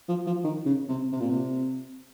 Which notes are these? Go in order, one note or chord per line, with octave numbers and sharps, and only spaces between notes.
F3
F3
D#3
C#3
C3
C3
A#2
C3